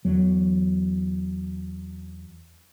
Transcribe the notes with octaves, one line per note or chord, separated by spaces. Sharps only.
E2 F#3